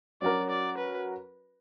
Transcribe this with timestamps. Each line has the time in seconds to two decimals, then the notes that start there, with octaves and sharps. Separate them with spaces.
0.22 F#3 C#4 F#4 A#4 D5
0.50 D5
0.78 B4